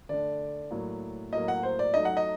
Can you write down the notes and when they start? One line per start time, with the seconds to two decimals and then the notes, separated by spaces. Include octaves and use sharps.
0.09 D3 A3 D4 D5
0.71 A2 F#3 A#3
1.33 A2 F#3 A#3 D#5
1.48 F#5
1.63 C5
1.79 D5
1.94 F#3 A3 D#4 D#5
2.05 F#5
2.17 D#5